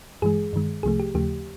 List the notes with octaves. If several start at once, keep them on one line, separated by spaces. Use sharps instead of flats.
G2 E3 G#3 G#4
G2 D#3 G#3
C2 C3 F3 A3 G#4
G4
D#2 C#3 F3 A3 G4